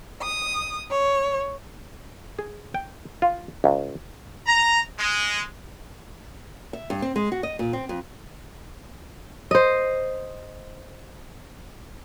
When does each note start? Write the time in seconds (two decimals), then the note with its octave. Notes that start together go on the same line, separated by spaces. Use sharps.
0.21 D#6
0.90 C#5
2.39 G#4
2.74 G5
3.22 F4
3.64 C#2
4.47 A#5
4.99 G#3
6.73 E5
6.90 G2
7.02 C4
7.16 G#3
7.32 F#4
7.43 D#5
7.59 A#2
7.73 C4
7.89 F2
9.51 C5 D#5